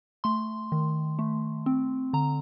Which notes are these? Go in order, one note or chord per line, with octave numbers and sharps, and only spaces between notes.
A3 C6
D#3
A3
C4
D3 A#5